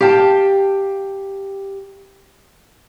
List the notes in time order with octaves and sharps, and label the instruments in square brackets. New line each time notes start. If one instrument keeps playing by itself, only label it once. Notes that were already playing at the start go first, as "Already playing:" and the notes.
[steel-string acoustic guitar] G4 F5 G5 A5